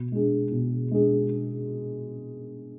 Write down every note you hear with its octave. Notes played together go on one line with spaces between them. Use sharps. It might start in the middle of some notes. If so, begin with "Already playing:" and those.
Already playing: B2
G#3 D4 G#4
B2
G#3 D4 G#4